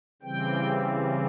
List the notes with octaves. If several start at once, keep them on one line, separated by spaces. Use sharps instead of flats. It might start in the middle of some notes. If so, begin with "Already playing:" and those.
C#3 E3 G3 C4 G5